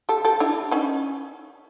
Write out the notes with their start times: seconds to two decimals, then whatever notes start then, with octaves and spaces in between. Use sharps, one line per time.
0.09 G4 A4
0.25 G4 A4
0.40 D4 E4
0.71 C#4 D#4